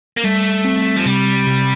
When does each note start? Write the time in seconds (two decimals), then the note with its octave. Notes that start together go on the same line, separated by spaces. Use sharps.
0.17 A#3
0.24 G3 A3
0.65 C4
0.96 F3
1.06 C3 G3
1.47 C3